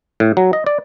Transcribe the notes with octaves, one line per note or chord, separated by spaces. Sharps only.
A2
F#3
D#5
D5